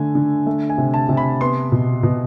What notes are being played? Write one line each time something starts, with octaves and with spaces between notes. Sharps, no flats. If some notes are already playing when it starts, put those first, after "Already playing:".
Already playing: D3 A3 G#5
D3
A3
G#5
C3
A5
C3
B5
B3 C6
B2
B2